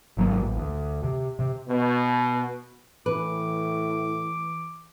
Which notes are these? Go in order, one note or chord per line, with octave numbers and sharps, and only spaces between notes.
G#1 F#3 A#3
A1
D2
C3
C3
B2
A2 E3 B4 D6